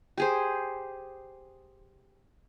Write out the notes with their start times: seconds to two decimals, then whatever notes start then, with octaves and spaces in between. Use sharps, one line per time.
0.18 G4 G#4 C5